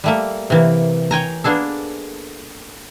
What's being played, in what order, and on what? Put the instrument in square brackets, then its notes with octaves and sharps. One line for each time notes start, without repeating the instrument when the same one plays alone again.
[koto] G3 A3 A#3
C3 E3 A#3
C#5 G5 G#5 A#5
A#3 B3 D4 G#4 A4